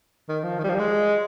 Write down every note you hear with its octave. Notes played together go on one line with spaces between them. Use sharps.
D#3
F3
D#3
G3
F3
G3
G#3